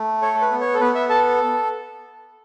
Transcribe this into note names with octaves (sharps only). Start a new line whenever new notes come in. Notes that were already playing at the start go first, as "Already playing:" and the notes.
Already playing: A3
A4 C#5
A4
B4
B3
C#5
A4
B3 B4
E5
A4 A5